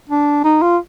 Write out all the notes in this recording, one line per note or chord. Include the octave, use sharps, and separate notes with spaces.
D4
D#4
F4